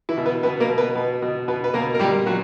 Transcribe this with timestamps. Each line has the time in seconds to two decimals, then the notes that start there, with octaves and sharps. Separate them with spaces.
0.09 E3 E4
0.17 B2
0.26 B3 B4
0.43 B2 B3 B4
0.60 A#3 A#4
0.69 B2
0.78 B3 B4
0.95 B2
1.22 B2
1.48 B2 B3 B4
1.64 B4
1.74 B2 A#3 A#4
1.95 A#4
1.99 A#2 G3 G4
2.26 A#2 F#3 F#4